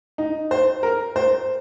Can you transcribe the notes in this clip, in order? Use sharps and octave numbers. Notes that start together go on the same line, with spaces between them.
D#4
C5
A#4
C5